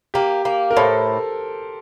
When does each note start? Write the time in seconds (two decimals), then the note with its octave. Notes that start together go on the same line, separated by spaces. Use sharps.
0.14 A#3 G4
0.45 A#3
0.71 A#4
0.77 A2 A4 C5